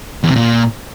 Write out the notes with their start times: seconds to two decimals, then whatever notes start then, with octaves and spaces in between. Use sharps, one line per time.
0.23 E2
0.30 C3
0.36 A#2